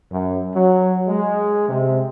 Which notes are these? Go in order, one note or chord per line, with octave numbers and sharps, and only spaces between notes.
F#2
F#3
G#3
C3